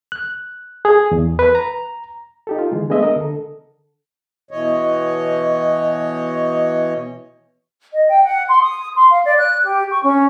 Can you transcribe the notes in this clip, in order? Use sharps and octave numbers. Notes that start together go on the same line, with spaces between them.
F#6
G#4
E2
B4
A#5
D#4 G4 A4
F4
D3 E3 G#3
G#3 A3 B3 D4 D#5 E5
A#4 D#5
D3 A4
B2 E3 C#5 D#5
D#5
G5
F#5
C6
D#6
C6
F5
D5
F#6
G4
C#6
C#4